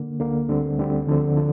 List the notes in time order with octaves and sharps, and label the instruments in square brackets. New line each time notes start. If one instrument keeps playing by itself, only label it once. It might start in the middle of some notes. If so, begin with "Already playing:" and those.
Already playing: [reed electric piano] D3 A#3
D2 D3 A#3
D2 D3 G3 C4
D2 D3 G3 C4
D2 D3 F3 C4
D3 F3